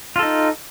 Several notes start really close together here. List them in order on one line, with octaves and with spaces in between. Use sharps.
F4 A4 D#4